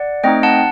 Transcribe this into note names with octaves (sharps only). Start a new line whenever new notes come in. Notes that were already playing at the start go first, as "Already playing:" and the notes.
Already playing: D5 F#5
A3 C4 D#4 D#5 G5
F#5 A5